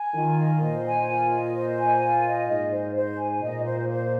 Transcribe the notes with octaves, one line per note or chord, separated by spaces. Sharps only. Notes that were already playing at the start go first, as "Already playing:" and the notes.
Already playing: G#5
D#3 F4
D#5
A#2 C5
G#5
F4
D#5
C5
G#5
F4
D#5
G#2 D#5
C5
C5
G#5
A#2 D#5
C5
C5